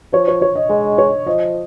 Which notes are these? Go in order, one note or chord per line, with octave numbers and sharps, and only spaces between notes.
F3 C#5
C#5
C#5
D#5
G#3 D#5
C#5
F3 D#5